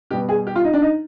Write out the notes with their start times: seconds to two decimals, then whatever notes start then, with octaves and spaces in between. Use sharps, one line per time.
0.11 B2 G3 B3 G4
0.29 G#4
0.47 G4
0.56 F4
0.64 D#4
0.73 D4
0.82 D#4